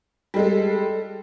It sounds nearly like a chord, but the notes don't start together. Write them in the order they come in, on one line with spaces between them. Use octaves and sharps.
G3 G#3 A4